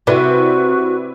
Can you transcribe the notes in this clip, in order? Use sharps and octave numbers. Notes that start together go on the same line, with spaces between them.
C3 E4 F#4 B4 D5